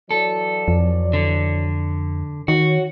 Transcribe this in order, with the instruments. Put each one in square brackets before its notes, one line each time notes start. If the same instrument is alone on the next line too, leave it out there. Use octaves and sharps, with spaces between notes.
[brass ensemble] E3 F#3 D5 [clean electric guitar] A4
[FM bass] F2
[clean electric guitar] D3
[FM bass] D#3 [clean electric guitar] F#4 [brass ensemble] C#5